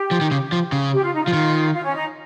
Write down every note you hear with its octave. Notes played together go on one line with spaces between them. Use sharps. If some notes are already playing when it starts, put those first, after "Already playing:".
Already playing: G4
F3
D#3
C#3
F3
C#3
G4
F4
D#4
F3 F4
D#3
F4
C#4
D#4